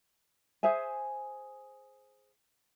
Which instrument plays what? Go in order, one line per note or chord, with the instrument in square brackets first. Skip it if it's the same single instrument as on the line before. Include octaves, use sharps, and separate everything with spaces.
[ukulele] G#4 C5 E5 G#5